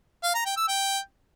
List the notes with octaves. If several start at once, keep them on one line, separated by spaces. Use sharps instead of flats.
F5
A#5
G5
E6
G5